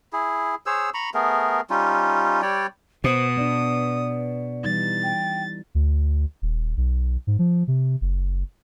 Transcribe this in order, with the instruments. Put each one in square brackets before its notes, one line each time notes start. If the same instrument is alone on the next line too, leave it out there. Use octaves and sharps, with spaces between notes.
[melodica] E4 G#4
G#4 C5 C#5 E6
A#5 B5 C#6
A3 B3 G#4 A#4
G3 C#4 D#4 F4
G3 C#5 D5 G5
[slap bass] B2 [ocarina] C5 [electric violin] D#6
[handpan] B3 D4 [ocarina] D5
[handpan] E3 G3 D#4 [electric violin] A6
[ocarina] G5
[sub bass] D2
D#1
B1
G#2
F3
C3
F#1